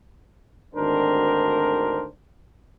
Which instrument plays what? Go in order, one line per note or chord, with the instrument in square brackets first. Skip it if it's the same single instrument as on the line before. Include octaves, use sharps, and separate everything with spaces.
[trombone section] G#1 D2 D#3 D4 A#4 C5